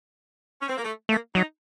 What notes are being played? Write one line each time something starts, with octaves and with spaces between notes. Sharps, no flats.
C#4
C4
A#3
A3
A3 A#3
F#3 D#4